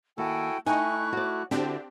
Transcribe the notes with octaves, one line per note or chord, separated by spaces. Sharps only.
D#2 E4 F#4 A4 G5 G#5
A3 D#4 E4 G5 G#5 C#6 F#6
F#4 D5
D3 C4 D4 E4 F#4 G4